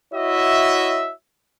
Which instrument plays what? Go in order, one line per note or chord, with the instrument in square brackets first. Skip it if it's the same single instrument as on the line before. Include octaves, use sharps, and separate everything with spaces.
[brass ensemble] E4 F#4 C#5 D#5 E5